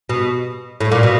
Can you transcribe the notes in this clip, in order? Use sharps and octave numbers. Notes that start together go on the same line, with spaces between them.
B2
A2
A#2
B2